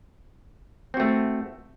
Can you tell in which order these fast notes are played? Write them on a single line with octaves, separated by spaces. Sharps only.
C4 F#4 A3